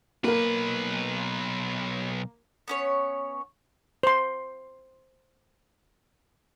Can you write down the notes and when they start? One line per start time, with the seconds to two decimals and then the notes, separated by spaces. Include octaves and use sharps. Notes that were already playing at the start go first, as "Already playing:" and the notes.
0.24 B1 A#3 A#4 B4
2.68 B3 C#4 C#5
4.03 C5 C6